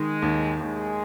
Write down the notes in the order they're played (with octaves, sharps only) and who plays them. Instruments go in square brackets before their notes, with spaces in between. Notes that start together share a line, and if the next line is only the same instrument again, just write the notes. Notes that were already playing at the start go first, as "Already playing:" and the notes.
Already playing: [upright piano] D#3 [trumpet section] G#3
[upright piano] D#2
[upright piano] D#2 [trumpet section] G#3